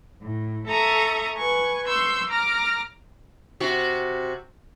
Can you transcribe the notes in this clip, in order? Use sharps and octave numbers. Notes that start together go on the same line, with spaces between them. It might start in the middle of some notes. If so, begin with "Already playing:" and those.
A2
A4 E5 A#5 C#6 D#6
B4 G#5 C#6
C6 C#6 E6 G6
A#5 D6 F6 A#6
C3 F#4